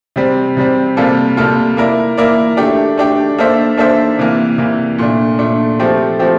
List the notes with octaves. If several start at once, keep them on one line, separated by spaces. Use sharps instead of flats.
C3 G3 C4
C3 G3 C4
C3 G3 A#3 F4 A4
C3 G3 A#3 F4 A4
A#3 E4 A#4 D5
A#3 E4 A#4 D5
A3 D4 G4
A3 D4 G4
A#3 D4 A4 C5 E5
A#3 D4 A4 C5 E5
C3 E3 A#3
C3 E3 A#3
A#2 A3 D4
A#2 A3 D4
F3 A3 C4 G4
F3 A3 C4 G4